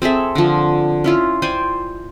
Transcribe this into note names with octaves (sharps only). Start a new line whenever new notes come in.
C4 G#4 A4 E5
D3 F3
C#4 E4 F4
C5 D5 G5 G#5